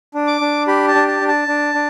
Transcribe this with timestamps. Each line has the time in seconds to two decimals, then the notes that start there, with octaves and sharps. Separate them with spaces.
0.15 D4
0.27 D6
0.41 D4
0.68 G4 B5
0.88 A5
0.95 D4
1.08 A5
1.21 D4
1.28 A5
1.48 D4
1.75 D4